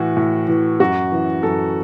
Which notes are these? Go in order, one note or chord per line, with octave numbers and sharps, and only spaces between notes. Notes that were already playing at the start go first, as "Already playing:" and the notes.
Already playing: A2 E3 F#4
A2
E3
F#2 F#4
E3
F#2 A4